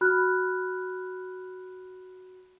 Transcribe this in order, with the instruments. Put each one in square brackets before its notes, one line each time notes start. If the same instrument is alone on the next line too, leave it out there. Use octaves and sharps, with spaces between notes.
[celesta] F#4 B5 F6 F#6